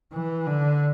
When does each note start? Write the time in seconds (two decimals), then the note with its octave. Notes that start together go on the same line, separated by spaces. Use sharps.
0.13 E3
0.46 D3